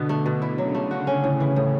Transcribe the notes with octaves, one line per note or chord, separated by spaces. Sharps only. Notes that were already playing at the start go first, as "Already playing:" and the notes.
Already playing: B2 D3 B3 F#4
A3
B2
E4
C#3 F#3
A3
C#3 F#4
C#4
A2 C#3
E3
A2